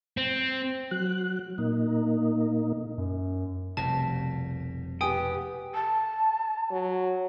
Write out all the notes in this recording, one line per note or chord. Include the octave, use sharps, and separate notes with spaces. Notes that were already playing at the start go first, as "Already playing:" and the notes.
C4
F#3 F#6
A#2 A#3 D#4
F#2
F1 C2 B2 A5
B3 G4 G5 G#5 D#6
A5
F#3